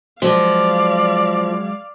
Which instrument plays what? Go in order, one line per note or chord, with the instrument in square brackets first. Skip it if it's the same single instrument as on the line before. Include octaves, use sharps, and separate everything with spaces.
[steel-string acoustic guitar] F3 [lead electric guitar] F#3 G#3 [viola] D5 F5